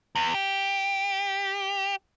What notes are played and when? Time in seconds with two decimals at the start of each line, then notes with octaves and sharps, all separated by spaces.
0.15 E2
0.34 G4